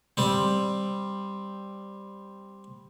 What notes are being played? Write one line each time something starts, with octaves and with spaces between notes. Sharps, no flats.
G3 C4